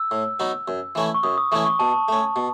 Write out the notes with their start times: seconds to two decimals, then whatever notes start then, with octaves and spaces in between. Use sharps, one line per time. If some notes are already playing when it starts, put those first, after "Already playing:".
Already playing: E6
0.11 A2
0.40 F#3 B3 D#4
0.68 F#2
0.95 E3 A3 C#4 E4
1.14 C#6
1.23 F#2 D#6
1.38 D#6
1.52 E3 A3 C#4 E4 C#6
1.66 C#6
1.79 B2 A5
2.08 A3 C#4
2.36 B2